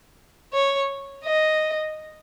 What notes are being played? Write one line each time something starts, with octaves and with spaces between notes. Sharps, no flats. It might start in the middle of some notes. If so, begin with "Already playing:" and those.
C#5
D#5